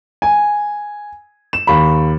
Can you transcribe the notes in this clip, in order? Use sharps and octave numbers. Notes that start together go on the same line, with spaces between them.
G#5
E7
D#2 B5